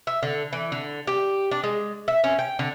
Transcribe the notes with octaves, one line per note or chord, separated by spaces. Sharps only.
E5
D3
E3
D3
G4
D4
G#3
E5
C#4
G5
D3